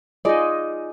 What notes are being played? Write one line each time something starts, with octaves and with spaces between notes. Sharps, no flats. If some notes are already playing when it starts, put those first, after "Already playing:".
D#4 F4 G#4 D5 D#5